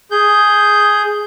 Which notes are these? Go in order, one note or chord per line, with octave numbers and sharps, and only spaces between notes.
G#4 G6